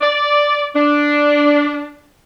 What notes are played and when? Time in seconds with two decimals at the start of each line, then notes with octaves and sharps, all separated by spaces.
0.02 D5
0.76 D4